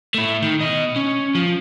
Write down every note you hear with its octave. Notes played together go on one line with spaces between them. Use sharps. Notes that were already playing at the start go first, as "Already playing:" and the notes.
A3 E4
D#3
B2 D#5
C#4
F3